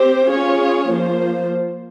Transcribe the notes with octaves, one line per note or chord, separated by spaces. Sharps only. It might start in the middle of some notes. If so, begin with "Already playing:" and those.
Already playing: C4 G4 C5
C#4 F4 G#4 C#5
F3 A#3 F4 C5